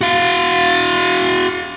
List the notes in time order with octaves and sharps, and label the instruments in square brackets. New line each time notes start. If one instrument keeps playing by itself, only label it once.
[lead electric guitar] F#4 F5